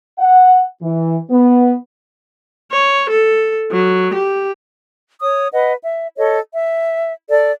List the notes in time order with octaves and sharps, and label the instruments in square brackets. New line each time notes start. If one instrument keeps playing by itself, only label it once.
[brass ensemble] F#5
E3
B3
[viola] C#5
A4
F#3
G4
[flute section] C#5 D#6
B4 D#5 F#5
E5
A4 C#5 D#5
E5
A4 D5